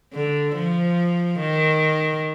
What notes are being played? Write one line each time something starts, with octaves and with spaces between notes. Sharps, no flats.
D3
F3
D#3